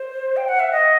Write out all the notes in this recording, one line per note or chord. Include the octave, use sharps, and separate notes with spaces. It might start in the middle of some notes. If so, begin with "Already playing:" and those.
Already playing: C5
G5
F#5
E5
D#5